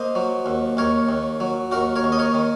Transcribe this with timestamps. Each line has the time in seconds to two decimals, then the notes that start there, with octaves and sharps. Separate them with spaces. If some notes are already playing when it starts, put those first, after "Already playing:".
Already playing: A#3 C5 D#5
0.15 F#3
0.46 D#2
0.77 D#2 A#4 C#5
1.09 D#2
1.40 F#3
1.72 D#2 F#4 A#4
1.96 A#4 C#5
2.04 D#2
2.12 D#5
2.19 A#4 C#5
2.34 D#3